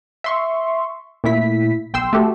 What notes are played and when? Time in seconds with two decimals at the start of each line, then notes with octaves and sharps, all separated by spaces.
0.24 E5 C6 C#6
1.24 A#2 A3 E4 B6
1.93 B1 G5 C6 E6
2.13 A3 F#4 G4 A4